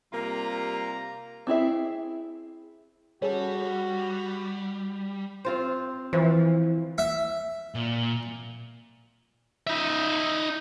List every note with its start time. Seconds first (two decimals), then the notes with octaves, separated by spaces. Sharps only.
0.13 C3 G3 A#3 F4 A#5
1.47 C4 E4 G#4 E5
3.22 G3 C#4 F#4 G#4 A4
5.45 C4 F4 C5
6.13 E3 F3
6.98 E5
7.75 A#2
9.67 D#4 E5